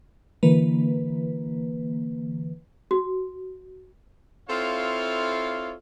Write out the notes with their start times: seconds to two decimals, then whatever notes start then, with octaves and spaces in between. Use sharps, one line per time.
0.43 D3 E3 A#3 B4
2.91 F#4
4.49 C4 E4 F4 A4 C#5 F5